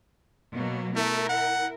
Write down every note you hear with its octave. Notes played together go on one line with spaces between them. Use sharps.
B2 F#3 A#3
A3 E4 A#4
F#5